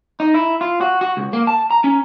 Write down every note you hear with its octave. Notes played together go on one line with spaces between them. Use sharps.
D#4
E4
F4
F#4
F#4
C#2
A#3
A5
A#5
C#4